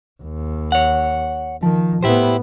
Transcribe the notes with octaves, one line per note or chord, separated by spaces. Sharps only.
D#2
C#5 F#5
D#3 F3
A2 B3 E4 G4 C5